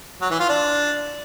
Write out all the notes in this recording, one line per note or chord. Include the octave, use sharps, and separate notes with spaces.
F#3
E3
F4
D4